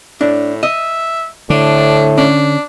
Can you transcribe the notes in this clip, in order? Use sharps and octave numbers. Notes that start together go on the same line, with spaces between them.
A2 D4
D#5 E5
A2 D3 D4
C#4 D4